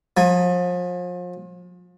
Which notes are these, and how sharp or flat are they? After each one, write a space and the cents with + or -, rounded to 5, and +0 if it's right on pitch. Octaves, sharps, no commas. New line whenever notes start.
F3 +35 G#5 -5